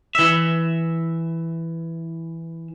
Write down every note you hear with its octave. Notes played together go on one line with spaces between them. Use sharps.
E3 E5